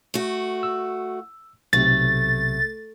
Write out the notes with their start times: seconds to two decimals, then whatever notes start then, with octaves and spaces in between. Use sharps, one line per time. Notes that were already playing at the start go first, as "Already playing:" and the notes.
0.14 A3 F#4
0.63 E6
1.73 B1 C3 A3 A6